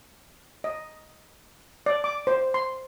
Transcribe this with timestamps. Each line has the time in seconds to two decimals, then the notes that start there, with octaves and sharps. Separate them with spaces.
0.64 D#5
1.86 D5
2.04 D6
2.27 C5
2.54 C6